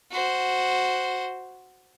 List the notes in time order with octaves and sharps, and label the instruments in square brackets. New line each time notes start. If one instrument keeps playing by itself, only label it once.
[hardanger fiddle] F#4 C5